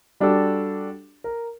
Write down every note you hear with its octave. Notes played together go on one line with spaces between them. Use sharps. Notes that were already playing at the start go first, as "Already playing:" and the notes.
G3 D4 F#4 G4 A4
A#4